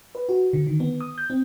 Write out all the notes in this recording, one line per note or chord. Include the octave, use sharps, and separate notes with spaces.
B4
F#4
D3
D#3
B3
D#6
G6
C4